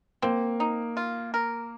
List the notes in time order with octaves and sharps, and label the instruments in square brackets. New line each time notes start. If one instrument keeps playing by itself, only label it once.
[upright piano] A#3 [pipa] C4
[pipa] D#4
F4
A#4